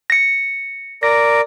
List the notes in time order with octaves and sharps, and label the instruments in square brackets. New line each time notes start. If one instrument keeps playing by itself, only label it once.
[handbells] A#6 C#7
[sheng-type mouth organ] A#4 D5 [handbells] A#6